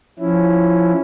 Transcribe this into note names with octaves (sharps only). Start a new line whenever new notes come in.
F3 C#4 E4